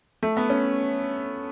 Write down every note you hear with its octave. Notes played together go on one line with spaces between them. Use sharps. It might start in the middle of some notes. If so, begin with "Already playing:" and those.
A3
B3
C#4